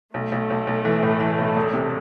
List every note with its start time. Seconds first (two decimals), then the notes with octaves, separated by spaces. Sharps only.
0.14 B1 A3
0.32 B1
0.50 B1
0.67 B1
0.85 E3
1.03 A2
1.20 E3
1.38 B1
1.56 E1
1.73 C3